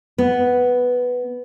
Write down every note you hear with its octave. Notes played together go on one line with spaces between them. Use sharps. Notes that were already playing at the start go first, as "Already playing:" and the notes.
B3